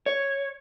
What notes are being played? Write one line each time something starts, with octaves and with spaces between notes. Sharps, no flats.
C#5